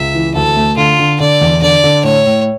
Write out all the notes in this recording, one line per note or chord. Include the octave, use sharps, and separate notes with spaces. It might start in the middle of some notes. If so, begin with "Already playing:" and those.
Already playing: C#2 E5
E3
D2 A4
A3
D3 F4
D3
D3 D5
E2
D3 D5
D3
A2 C#5
A2